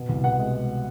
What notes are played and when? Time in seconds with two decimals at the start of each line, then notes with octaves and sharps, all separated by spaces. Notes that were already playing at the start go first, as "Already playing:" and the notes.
Already playing: B2
0.09 C2
0.24 B2 F#5
0.39 G#3